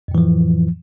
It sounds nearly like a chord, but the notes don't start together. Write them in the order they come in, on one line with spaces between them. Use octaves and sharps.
F2 A2 E3 F3